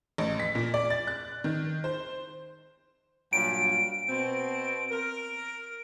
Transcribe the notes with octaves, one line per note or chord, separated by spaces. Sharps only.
A1
B6
A#2
D5
A6
F#6
D#3
C5
G2 A#2 F#3 D7
B2 C4
A#4